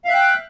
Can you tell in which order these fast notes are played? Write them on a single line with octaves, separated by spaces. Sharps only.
F5 E5 F#6 G5